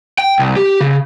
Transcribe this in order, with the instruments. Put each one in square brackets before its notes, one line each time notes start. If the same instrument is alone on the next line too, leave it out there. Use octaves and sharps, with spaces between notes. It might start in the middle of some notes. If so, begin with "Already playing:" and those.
[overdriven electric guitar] G5
C2
G4
C#3